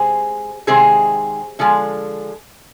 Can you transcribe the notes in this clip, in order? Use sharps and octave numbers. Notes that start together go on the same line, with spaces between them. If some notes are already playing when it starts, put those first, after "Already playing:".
Already playing: C3 G#3 G#4 C5
C3 D#3 G#3 G#4 C5
D3 F3 G#3